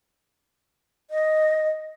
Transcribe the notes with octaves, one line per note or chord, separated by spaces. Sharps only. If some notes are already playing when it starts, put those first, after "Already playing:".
D#5